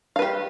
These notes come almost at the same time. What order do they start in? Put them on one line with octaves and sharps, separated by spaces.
F5 B4 G4